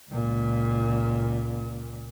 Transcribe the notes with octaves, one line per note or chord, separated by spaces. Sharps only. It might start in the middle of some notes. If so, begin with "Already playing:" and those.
C#2 A#2